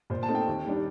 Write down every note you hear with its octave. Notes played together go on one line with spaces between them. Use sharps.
A#2 C5
A5
A3 C4 D#4
G5
D#2
D#3 G3 D4